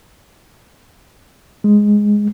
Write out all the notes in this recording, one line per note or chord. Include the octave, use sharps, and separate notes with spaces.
G#3